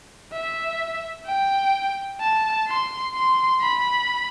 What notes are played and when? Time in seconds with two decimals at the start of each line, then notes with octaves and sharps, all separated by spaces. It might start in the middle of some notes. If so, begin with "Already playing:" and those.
0.33 E5
1.26 G5
2.21 A5
2.68 C6
3.15 C6
3.61 B5